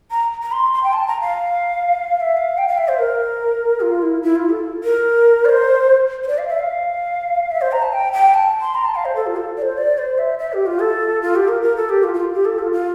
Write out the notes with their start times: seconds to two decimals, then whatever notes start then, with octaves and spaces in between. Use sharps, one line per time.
0.11 A#5
0.42 A#5
0.52 C6
0.73 C6
0.83 G5
0.93 A5
1.07 A#5
1.21 F5
2.16 F5
2.20 E5
2.37 F5
2.58 G5
2.68 F5
2.78 E5
2.88 C5
2.99 A#4
3.81 F4
4.02 E4
4.23 E4
4.36 F4
4.50 A4
4.84 A#4
5.45 D5
5.49 C5
6.23 C5
6.28 D5
6.38 F5
6.48 E5
6.59 F5
7.51 E5
7.61 C5
7.72 A#5
7.82 A5
7.93 G5
8.13 G5
8.34 A5
8.61 C6
8.75 A#5
8.85 A5
8.95 F5
9.05 C5
9.16 A4
9.27 F4
9.36 A4
9.57 D5
9.62 C5
9.78 D5
9.98 C5
10.18 E5
10.39 E5
10.53 G4
10.66 F4
10.81 A4
11.22 F4
11.36 G4
11.48 A#4
11.62 A#4
11.76 A4
11.89 G4
12.03 F4
12.14 F4
12.34 G4
12.45 A4
12.59 F4
12.72 F4